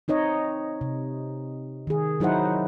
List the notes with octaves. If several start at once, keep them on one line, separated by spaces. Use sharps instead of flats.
C4 D#4 C#5 D#5
C3
D#3 G#4
F#3 D#4 E4 C5 F#5